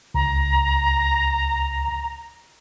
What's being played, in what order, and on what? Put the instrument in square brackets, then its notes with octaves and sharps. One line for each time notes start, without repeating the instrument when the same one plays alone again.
[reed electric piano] C#2 [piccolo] A#5